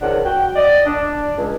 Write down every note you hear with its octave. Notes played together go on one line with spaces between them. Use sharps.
C#2 G#2 D#3 C#4 D4 F#5
F#4 G5
D5 D#5
D4
C#2